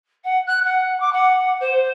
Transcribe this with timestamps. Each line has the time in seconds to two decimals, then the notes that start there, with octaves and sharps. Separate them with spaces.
0.24 F#5
0.47 F#6
0.64 F#5
1.00 D6
1.12 F#5
1.60 C5